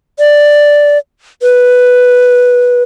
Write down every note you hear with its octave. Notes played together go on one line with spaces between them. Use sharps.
D5
B4